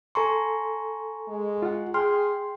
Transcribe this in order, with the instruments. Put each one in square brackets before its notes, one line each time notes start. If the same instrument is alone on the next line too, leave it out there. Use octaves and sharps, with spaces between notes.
[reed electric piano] A4 C6 [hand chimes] G#5 A#5 C#6
[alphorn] G#3
[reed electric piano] F4 F#5
[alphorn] G#4 [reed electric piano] G5 C6 [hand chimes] F6